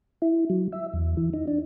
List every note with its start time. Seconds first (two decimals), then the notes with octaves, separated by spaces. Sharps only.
0.22 E4
0.50 F#3
0.72 E5
0.94 E2
1.17 E3
1.34 D#4
1.48 D4